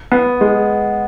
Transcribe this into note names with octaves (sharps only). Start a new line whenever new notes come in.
B3
G#3